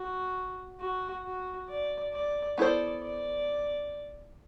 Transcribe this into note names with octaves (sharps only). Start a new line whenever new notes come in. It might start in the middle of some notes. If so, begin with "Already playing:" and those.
Already playing: F#4
F#4
F#4
D5
D5
B3 E4 A4 C5 D5
D5